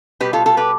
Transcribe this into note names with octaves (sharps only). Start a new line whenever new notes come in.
B2 G3 G4 B4
F4 A4
F4 A4
G4 B4